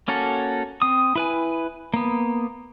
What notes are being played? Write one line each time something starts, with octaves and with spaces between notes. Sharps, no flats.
A#3 C#4 F#4 A4
C4 D#6
E4 B4 G#5
A#3 B3